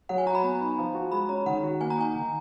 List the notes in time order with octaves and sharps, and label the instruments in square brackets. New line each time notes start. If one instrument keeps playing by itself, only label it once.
[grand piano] F#3 [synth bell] F#5
[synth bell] G#5
[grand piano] F#4 [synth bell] A#5
[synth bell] B5
[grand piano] B3 [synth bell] A#5
[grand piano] D#4
F3
F#4
[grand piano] G#3 [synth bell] B5
[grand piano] C#4 [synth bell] A#5
[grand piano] D#3 [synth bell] F#5
[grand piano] F#4
[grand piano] A#3 [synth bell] G#5
[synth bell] A#5
[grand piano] D#4 [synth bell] G#5
[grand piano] D#3